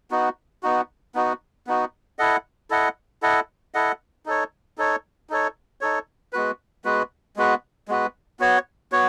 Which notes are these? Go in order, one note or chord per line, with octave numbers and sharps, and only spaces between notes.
B3 D#4 F#4
B3 D#4 F#4
B3 D#4 F#4
B3 D#4 F#4
E4 A4 D#5 F#5
E4 A4 D#5 F#5
E4 A4 D#5 F#5
E4 A4 D#5 F#5
D#4 A4 C#5
D#4 A4 C#5
D#4 A4 C#5
D#4 A4 C#5
G#3 B3 F#4 B4
G#3 B3 F#4 B4
G#3 B3 F#4 B4
G#3 B3 F#4 B4
B3 F#4 C#5
B3 F#4 C#5